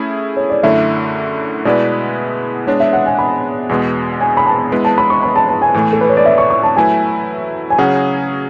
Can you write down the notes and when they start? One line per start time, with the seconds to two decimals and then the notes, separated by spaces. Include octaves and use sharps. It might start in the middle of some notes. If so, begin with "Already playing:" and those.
Already playing: A3 C#4 E4 G#4
0.37 C#5
0.50 D5
0.63 F#2 D3 A3 E4 E5
1.65 B2 G#3 B3 E4 B4 D5
2.67 G#3 B3 D4 C#5
2.80 E5
2.93 F#5
3.06 G#5
3.19 B5
3.69 E2 B2 G#3 B3
4.21 G#5
4.37 B5
4.46 A5
4.72 G#3 B3 E4 B4
4.85 A5
4.98 B5
5.10 C#6
5.23 B5
5.36 A5
5.49 A5
5.62 G#5
5.74 A2 E3 A3
5.93 A4
6.01 B4
6.09 C#5
6.17 D5
6.25 E5
6.38 C#6
6.50 C#6
6.63 A5
6.76 F#3 A3 E4 B4 G#5
7.70 G#5
7.78 C#3 F#3 C#4 G#4 F#5